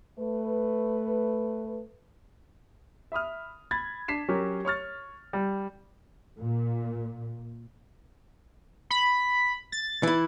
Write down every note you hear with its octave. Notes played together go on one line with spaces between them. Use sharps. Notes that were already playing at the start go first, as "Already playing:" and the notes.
A3 B4
E5 B5 D#6 F6
B5 G#6 A6
D4 B6 C7 E7
F#3 C#4 G4 A#4
C#5 C#6 F6 A6
G3
A#2
B5
A6
E3 E4